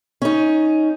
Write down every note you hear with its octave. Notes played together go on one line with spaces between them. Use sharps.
C#4 D#4